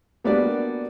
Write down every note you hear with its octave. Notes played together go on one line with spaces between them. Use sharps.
G3 A#3 B3 D4 F#4 D5